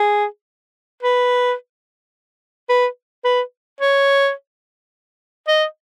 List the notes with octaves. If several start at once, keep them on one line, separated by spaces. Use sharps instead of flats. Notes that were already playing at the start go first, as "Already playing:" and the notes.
Already playing: G#4
B4
B4
B4
C#5
D#5